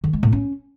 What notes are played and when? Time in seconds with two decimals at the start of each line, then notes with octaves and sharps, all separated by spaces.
0.04 D#3
0.13 G#3
0.23 A2
0.32 C#4